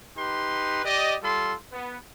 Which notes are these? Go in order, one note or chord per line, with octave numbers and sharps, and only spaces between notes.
D#4 G4 B4 C6
G4 D5 D#5
G3 F4 A4 C6
B3